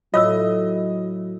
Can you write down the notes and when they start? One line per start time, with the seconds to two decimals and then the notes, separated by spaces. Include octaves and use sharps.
0.14 A2 F#3 F4 C#5 D#5 E6